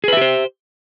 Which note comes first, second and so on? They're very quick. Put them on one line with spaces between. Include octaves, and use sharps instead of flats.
G#4 B4 E5 G4 C5